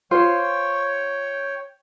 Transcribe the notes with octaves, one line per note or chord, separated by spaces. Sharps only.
F4 C5 C#5 G5